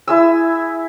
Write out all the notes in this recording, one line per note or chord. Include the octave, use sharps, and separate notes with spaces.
E4 G#4 E6